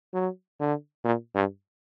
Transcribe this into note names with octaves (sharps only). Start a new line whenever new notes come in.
F#3
D3
A#2
G2